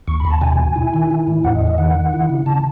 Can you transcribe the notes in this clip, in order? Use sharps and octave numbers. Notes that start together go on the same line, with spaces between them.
D#2 C#6
B5
D#2
A5
B2 G#5
B2
E4
D#3
E4
A2
E2 F#5
D#5
E2
D#5
D#3 F#5
D#3
E4
C#3
C#3 A5